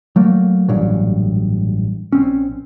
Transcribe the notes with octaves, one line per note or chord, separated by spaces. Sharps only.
F#3 A3 A#3
A1 G2 A#2 F#3
A#1 C4 C#4